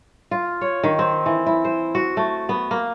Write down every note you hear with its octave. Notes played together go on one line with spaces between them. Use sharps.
F4
C#5
D#3
C4
E3
E4
C5
F#4
A3
B3
A#3